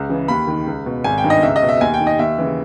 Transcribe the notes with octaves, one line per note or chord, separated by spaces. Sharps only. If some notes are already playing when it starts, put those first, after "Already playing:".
Already playing: C#2
C#3 E3
D#2 B5
D#3
C#2
B2
G#1 G#5
G5
G2 D#3
D#5
C#2 E5
D#5
B2
E5
D#2 G#5
G5
D#3
D#5
D#2 E5
C#3 E3